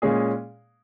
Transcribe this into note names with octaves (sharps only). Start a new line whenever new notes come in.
A#2 G#3 C#4 G#4